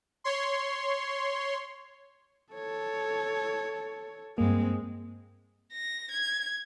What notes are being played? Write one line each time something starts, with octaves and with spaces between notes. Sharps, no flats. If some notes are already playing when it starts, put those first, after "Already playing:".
C#5 C6
A4 C#5
G2 G#3 A#3 C4
A#6
G#6